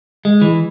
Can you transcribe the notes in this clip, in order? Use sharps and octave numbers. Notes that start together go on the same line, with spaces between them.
G#3
E3